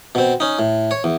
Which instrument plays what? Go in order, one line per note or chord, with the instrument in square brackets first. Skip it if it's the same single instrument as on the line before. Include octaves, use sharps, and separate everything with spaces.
[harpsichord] B2 C4
C#4 D#4
A2
C#5
E2